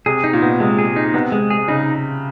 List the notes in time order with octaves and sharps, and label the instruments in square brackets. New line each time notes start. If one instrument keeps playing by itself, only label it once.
[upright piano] C3 [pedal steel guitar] G#4
[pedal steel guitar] D#4
[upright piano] A#2
[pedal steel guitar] B3
[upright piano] C3 [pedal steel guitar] G#3
[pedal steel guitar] G#4
D#4
[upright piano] C3 [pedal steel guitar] B3
[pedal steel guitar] G#3
G#4
[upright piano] C#3 [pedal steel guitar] D#4